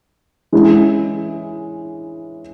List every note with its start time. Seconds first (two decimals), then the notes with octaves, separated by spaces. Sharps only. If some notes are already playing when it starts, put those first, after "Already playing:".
0.52 E3 G#3 C#4 E4